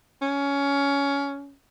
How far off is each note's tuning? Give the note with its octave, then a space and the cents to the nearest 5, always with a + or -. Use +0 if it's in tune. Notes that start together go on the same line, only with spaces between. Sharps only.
C#4 +15